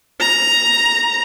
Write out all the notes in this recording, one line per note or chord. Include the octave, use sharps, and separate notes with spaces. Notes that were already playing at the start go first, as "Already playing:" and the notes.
A#5